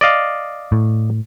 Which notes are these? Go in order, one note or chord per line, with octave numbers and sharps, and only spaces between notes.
D5 D#5 F5
A2